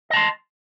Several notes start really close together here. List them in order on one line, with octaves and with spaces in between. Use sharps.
D#5 A5 C6